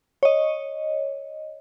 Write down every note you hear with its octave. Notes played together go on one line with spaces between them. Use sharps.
C#5 D#5